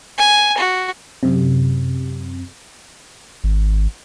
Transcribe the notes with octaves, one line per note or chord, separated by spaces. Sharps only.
G#5
F#4
F#2 C3
G#1